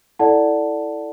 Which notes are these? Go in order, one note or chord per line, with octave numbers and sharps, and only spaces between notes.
E4 A4 D5 F#5 A5